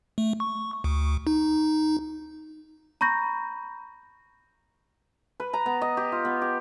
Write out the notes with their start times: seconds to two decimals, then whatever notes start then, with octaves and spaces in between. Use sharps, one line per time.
0.18 A3
0.40 C#6
0.84 D2
1.27 D#4
3.01 A#5 B5 C#6 G6 A#6
5.40 B4
5.53 A#5
5.66 B3
5.82 D#5
5.97 G4
6.12 F4
6.25 B3
6.42 G4